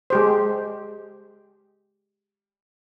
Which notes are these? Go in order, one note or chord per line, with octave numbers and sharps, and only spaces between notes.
G#3 G4 C5